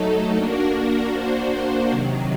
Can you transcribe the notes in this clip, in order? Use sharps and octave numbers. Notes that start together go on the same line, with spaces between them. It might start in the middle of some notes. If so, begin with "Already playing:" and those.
Already playing: F#3 A3 D#4 A4
A#3 D4 F#4 A#4
A#3 D4 F#4 C5
C3 D#3 F#3